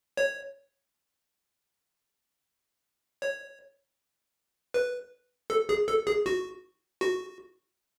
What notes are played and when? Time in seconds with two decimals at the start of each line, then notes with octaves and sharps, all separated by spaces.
0.17 C#5
3.22 C#5
4.74 B4
5.50 A4
5.69 G#4
5.88 A4
6.07 G#4
6.26 F#4
7.01 F#4